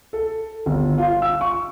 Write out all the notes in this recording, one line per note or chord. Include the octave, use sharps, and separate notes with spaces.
A4
G1
F4
E6
C#6